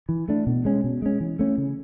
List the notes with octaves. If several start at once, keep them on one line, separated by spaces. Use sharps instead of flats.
E3
A3 D4
B2
G#3 C#4
B2
G#3 C#4
E3
A3 C#4
C#3